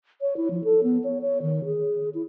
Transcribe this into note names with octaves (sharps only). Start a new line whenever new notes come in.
C#5
E4
F3
A4
B3
C#5
C#5
D#3
G#4
E4